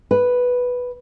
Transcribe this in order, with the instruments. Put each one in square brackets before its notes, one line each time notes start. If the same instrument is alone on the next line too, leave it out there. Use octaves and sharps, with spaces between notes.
[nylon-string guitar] B4